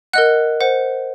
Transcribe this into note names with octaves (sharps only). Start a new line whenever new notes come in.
A#4 D#5 F#5 F#6
C5 F#5